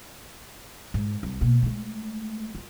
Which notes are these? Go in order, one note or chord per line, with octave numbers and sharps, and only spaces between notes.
G#2
C2
B2 A#3
G#3 A3
F4